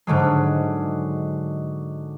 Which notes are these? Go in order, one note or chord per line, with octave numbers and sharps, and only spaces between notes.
G#2 D3 F#3 G#3